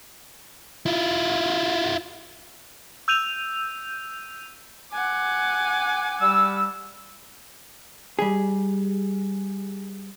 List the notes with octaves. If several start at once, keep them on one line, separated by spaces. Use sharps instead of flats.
E4 F4
E6 G6 D#7 F7
F#5 G#5 D6
G3 E6
G3 G#4